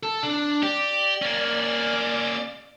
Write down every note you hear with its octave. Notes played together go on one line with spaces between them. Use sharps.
A4
D4
G4 D5
A#3 C#4